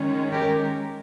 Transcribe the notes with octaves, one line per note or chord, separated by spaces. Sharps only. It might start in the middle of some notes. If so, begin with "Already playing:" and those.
Already playing: D#3 G#3 C#4
G4 A#4